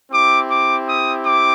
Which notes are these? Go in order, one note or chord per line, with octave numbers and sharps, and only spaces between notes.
C4 E4 G4 D6
D6
D#6
D6